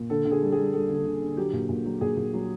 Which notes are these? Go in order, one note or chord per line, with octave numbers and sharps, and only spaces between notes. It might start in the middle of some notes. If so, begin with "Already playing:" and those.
Already playing: A#2
D3 A4
D3
G#4
G3
G3 G#4
G3 A4
D3
A4
D3
D3
F#3 G4
A#2
A#2
F#3
A#2 G#4
A#2
F#3